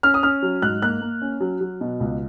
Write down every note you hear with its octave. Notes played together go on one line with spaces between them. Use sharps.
C#4 F6
D#6
C#4 F6
F#3
G#2 F#6
A#3 F#6
A#3
C#4
F#3
F#3
B2
C#2